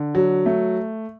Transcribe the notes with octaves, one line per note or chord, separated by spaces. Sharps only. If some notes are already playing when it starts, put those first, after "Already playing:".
Already playing: D3
F#3
A3